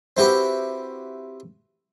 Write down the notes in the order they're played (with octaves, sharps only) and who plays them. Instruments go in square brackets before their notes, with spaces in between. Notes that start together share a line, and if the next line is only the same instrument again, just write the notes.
[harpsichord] C4 E4 F#4 G4 B4